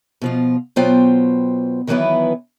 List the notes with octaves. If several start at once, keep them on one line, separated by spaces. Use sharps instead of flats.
B2 F3 F4
B2 F#3 B3 F4 C5 G5
D#3 E3 F#3 B3 E4 B4